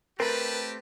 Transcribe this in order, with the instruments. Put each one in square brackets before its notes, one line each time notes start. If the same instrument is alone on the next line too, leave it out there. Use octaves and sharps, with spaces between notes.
[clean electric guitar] A3 C4 [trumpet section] G4 A5 [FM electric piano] A#4 [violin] B4